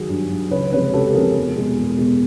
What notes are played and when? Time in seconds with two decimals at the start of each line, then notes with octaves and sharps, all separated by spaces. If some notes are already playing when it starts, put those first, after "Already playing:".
Already playing: D#3 F#3 F#4 G#4
0.09 G2
0.31 D#3 F#3
0.51 C#2 B4 C#5
0.72 C3 F3 G#3 B4 C#5
0.93 C#2 G4 A4
1.14 C3 F3 G#3 G#4 A#4
1.36 E2
1.57 B2 G#3
1.77 E2
1.99 B2 G#3